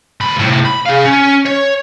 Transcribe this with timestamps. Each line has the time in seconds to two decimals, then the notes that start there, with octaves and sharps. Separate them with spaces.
0.21 D2 B5
0.39 A2 C3
0.65 B5
0.86 G#4 F5
1.05 C#4
1.46 C#5